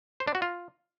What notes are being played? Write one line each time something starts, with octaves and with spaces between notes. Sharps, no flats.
C5
D4
F#4
F4